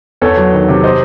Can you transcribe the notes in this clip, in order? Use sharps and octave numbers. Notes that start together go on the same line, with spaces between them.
E2 A4 C#5
F#3
D#3
C3
C5 D#5